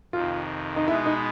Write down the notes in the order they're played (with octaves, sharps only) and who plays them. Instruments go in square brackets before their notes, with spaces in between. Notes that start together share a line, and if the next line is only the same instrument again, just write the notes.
[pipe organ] F2 C3 D#3 [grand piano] F4
[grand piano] D#4
[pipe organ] B2 G#3 B3 [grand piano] E4
[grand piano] D#4